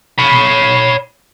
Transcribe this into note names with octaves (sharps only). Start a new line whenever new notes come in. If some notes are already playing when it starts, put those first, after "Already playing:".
C#5 B5